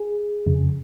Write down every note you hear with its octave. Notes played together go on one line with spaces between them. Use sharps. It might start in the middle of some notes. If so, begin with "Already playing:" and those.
Already playing: G#4
F2 C#3